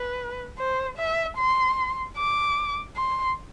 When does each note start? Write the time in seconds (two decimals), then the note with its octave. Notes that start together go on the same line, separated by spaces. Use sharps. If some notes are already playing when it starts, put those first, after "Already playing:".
Already playing: B4
0.59 C5
0.98 E5
1.37 C6
2.17 D6
2.96 C6